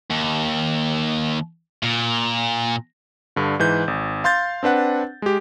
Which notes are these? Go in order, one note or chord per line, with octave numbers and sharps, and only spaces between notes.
D#2
A#2
G2 D3
G#2 E3 G6
G#1
F5 C6 G6 A6
C4 D4 B4 F#5
G#3 G4